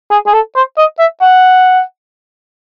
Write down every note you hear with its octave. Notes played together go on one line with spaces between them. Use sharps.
G#4
G#4
A4
C5
D#5
E5
F#5